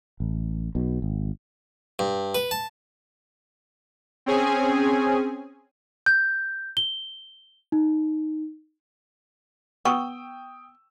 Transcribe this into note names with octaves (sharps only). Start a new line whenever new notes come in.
A1
B1 B2
G#1
G2
B4
A5
C4 C#4 G#4 G#5
G6
G7
D#4
B3 G5 C#6 D#6 E6